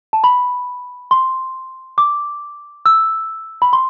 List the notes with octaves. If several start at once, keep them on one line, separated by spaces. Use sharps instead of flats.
A5
B5
C6
D6
E6
B5
C6